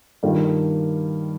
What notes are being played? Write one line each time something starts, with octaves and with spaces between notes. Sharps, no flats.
G2 D#3 A#3 F4 A#4